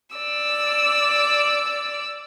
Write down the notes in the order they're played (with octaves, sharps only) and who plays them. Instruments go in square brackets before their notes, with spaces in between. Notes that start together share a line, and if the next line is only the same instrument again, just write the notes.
[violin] D5 E6